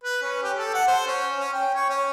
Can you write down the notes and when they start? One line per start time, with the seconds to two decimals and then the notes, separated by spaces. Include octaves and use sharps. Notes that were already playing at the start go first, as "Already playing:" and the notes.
0.03 B4
0.22 C#4
0.43 G4
0.57 A4
0.74 F#5
0.87 C5
1.07 C#4
1.38 C#4
1.53 G5
1.74 C#5
1.89 C#4